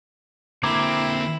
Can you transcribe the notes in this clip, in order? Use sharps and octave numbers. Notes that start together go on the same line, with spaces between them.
D3 A#3 C4 E4 A#5 D6 G#6